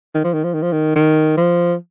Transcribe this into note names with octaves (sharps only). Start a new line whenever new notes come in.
D#3
F3
D#3
F3
D#3
F3
D#3
D#3
F3